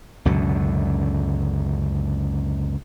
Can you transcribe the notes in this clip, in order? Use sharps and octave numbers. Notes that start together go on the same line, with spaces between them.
C#2 F#2 B2 D3